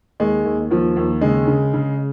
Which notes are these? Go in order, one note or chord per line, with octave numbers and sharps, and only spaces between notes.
D#2 G#3
D#2
D#2 F3
D#2
C#3 G#3
C#3
C#3